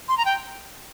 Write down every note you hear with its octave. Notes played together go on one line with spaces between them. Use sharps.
C6
A#5
G5